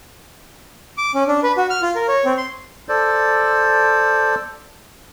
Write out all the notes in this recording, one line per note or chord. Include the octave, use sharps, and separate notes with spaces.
D6
C#4
D4
B4
F#4
F6
F4
A#4
C#5
C4
C6
A4 C5 D5